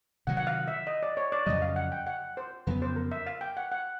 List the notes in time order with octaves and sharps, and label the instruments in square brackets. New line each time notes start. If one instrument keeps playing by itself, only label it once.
[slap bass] C3 D#3 F#3 [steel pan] F#5
[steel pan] F#5
F5
E5
D#5
D5
C#5
D5
[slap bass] F2 C#3 F#3 [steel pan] D#5
[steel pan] F5
F#5
G5
F#5
C5
[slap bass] F2 C#3 F#3 B3 [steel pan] B4
[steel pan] C5
A#4
E5
F5
G5
F#5
F#5